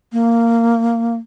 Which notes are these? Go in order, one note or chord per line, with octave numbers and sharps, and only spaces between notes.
A#3